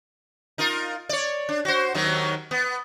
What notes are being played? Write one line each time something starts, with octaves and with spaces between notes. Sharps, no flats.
D#4 F4 A#4
C#5 D5
D4
F#4 C5
D#2 D#3 F#3
B3